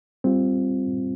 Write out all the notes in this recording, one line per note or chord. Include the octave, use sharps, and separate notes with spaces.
G3 C4 F4